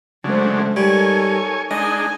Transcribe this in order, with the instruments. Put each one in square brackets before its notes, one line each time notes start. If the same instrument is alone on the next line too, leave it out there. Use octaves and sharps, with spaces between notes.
[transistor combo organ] C#3 F#3 D4 [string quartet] G#3 A3 C5
[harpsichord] G3 [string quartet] D#4 A4 A#4 [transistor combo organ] C#5 G#5
[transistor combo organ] G#3 D4 D#4 [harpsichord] D#5 [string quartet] G#5